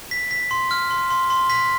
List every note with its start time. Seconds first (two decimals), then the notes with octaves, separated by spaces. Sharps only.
0.11 B6
0.31 B6
0.51 C6
0.71 F6
0.91 C6
1.10 C6
1.30 C6
1.50 B6